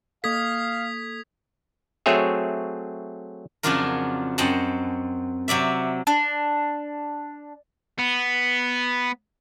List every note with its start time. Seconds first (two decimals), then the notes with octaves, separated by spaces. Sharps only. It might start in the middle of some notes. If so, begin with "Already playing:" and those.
0.24 A#3 A4 F5 D#6 G#6 B6
2.06 F#3 A3 C4 G#4 C#5 E5
3.63 F2 C#3 F#3 D4 F4 A#4
4.38 F#2 C4 D#5 F#5 A5
5.48 C3 F#3 D5 E5
6.07 D4
7.99 B3